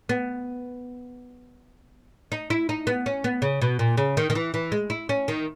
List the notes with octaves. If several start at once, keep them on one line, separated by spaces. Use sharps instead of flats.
B3
D#4
E4
D#4
B3
C#4
B3
C#3
B2
A#2
C#3
D#3
D#3
E3
E3
G#3
E4
C#4
D#3